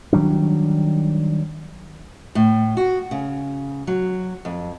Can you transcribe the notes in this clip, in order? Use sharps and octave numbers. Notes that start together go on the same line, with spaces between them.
D#3 F#3 G3 D4
A2
F#4
C#3
F#3
F2